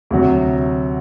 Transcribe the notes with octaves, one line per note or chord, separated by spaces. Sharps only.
D2 C3 F#3